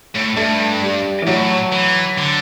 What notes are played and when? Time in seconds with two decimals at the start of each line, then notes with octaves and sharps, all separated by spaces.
0.15 A2
0.37 G2 A3
0.82 G3
1.22 E3
1.27 A2 F#3
1.72 E3
2.18 D3